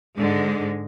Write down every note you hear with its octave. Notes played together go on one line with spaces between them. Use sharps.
G#2 D3 G#3